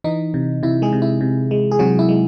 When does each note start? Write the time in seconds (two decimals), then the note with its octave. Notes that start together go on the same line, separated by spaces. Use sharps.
0.04 E3 D#4
0.34 C3
0.63 C3 E4
0.82 G#3 G#4
0.92 C3
1.02 E4
1.21 C3
1.51 G#3
1.71 G#4
1.79 C3 F#3 F#4
1.99 E4
2.09 G#3